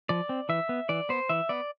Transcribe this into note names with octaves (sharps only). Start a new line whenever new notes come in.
F3 D5
C4
E3 E5
B3
E3 D5
B3 C5
E3 E5
B3 D5